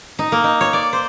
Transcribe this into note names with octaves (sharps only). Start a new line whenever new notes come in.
D#4
A#3
D#4
C#5
D5
C5